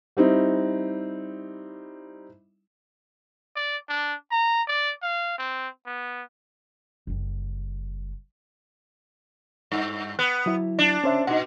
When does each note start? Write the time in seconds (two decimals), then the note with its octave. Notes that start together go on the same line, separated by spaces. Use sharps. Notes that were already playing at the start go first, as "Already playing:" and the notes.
0.17 G3 C4 D#4 E4
3.56 D5
3.89 D4
4.31 A#5
4.68 D5
5.03 F5
5.38 C4
5.86 B3
7.07 F#1 G3
9.72 G2
10.19 B3 F#6
10.46 F#3 E4
10.79 D4
11.04 C#4 C5 E5
11.27 B2 D#4 F#5